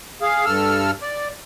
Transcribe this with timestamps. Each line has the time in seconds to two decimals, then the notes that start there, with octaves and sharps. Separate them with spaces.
0.22 G#4 F5
0.45 G2 A4 E6 F6
1.02 D5